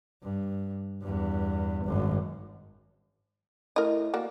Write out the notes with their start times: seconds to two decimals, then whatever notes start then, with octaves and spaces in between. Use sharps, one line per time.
0.23 G2
1.02 E2 G2
1.85 G#1 F#2
3.76 A2 A#4 D#5
4.14 A#3 F#4 D5